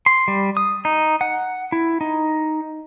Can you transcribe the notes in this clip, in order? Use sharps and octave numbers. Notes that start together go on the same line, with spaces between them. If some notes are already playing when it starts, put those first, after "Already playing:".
C6
G3
D#6
D#4
F#5
E4
D#4